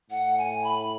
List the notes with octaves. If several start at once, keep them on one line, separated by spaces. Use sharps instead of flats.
A2 F#5
G#5
B5